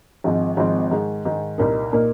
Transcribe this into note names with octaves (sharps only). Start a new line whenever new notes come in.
G#1 G#2 F3 C4
G#1 G#2 F3 C4
G#2 D#3 G#3
G#2 D#3 G#3
C2 A#2 A#3 D#4 A#4
A#2 A#3 D#4 A#4